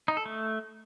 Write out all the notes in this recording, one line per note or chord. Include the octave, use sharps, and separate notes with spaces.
D#4
A4
A3